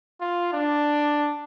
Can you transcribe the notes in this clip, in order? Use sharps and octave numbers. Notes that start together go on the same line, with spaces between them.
F4
D4